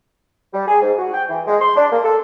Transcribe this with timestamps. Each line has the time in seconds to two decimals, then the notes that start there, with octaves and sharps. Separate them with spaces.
0.54 G3
0.68 G#4
0.82 G#2
0.98 F#4
1.14 G5
1.29 E3
1.47 G#3
1.61 C6
1.76 D4
1.92 A#3
2.04 A4